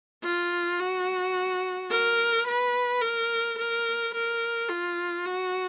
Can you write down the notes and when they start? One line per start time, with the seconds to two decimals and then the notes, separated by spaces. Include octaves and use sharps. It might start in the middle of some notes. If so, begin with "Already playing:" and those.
0.24 F4
0.79 F#4
1.91 A#4
2.46 B4
3.02 A#4
3.58 A#4
4.14 A#4
4.69 F4
5.26 F#4